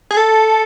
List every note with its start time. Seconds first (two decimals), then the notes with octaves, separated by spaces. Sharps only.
0.11 G#4
0.17 A4